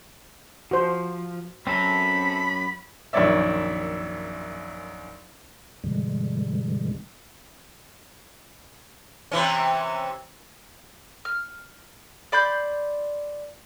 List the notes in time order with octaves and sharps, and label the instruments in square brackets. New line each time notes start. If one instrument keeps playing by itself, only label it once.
[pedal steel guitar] F3 [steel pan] F#4 C5
[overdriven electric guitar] F#2 C#4 [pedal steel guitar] C4 A4 A#5 [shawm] B5
[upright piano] A#1 F#2 D#3 C#5 D5 E5
[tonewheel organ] G2 B2 D3 E3 G3 G#3
[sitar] C3 E3 C#4
[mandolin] F6
D5 B5 C6 G6